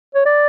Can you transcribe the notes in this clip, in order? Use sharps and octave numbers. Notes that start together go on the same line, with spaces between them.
C#5
D5